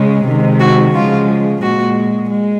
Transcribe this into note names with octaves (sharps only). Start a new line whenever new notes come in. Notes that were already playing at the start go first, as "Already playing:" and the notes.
Already playing: C#3 G#3
C3 D#3 G#3
F#4
C#3 F3 G#3 F4
A#2 G#3 F#4
G#3